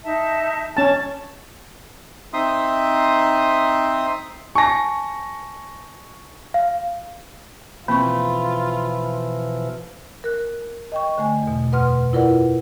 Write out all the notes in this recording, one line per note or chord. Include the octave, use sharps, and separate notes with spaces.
D#4 E5 A5
C#4 A5 C#6
C4 D#4 E5 C6 D#6
G#5 A5 C#6 A#6
F5
B2 E3 F3 A#3 C4 F4 B5 C#6
A#4 F#6
D#5 G5 C#6
D3 A3 G#5
E2 B2
F#2 B2 B4 F#5 C6 F6
E4 F4 A#4 B4 D5 F#5